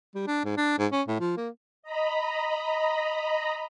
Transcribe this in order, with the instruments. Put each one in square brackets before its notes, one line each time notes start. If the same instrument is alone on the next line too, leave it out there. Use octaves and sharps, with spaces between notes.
[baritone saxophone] G3
D4
G#2
D4
G#2
C#4
A2
F3
A#3
[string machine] D#5 A#5 B5